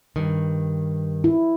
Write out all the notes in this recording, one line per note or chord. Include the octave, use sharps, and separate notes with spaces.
G2 D#3
E4